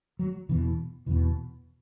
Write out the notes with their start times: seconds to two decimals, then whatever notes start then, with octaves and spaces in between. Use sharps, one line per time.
0.19 F#3
0.49 E1 E2 B2 E3
1.06 E1 E2 B2 E3